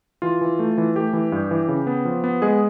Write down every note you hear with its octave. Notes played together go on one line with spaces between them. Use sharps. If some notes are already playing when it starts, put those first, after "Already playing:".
E3 F4
E3
A3
E3
A3 G4
E3
G2
E3
C#3
B3
F3
B3
G#3 G#4